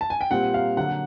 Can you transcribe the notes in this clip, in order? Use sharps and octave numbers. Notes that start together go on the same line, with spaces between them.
A5
G#5
G5
A#2 G3 C4 F#5
F5
D3 F#3 A#3 F#5